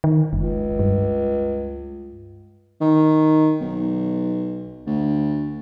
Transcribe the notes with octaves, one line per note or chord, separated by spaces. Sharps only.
D#3
F#1 C#2
G2
D#3
B1
D2